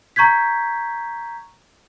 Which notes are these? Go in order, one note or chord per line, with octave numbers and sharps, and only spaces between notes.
A#5 C#6 G6 G#6 B6